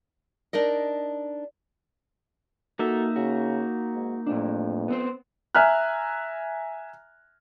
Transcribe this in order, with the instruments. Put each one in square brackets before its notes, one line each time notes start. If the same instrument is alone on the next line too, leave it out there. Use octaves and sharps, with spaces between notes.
[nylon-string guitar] D4 D#4 A#4 D#5
[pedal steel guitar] A#3 D#4 E5 [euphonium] F#4 [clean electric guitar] A4
[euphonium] C#3 [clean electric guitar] F#4
[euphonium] G#2
[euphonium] F2 [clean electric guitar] A2 D4
[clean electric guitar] B3 C4 C5
[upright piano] E5 G#5 A#5 F6 F#6